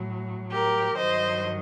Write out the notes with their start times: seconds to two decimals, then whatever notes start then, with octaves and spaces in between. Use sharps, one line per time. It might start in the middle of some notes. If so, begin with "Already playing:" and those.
Already playing: A2 F#3
0.52 G4 A#4
0.97 G2 D#3 F#3 C5 D#5